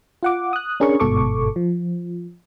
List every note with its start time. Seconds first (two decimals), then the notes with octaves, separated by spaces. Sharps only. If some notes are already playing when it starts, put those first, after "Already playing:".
0.23 F4 F#5 D6
0.53 D#6 F#6
0.80 C#4 D4 G#4 A#4 C#5 C#6
1.00 G1 G#2 B2 A4 C#6 D6
1.56 F3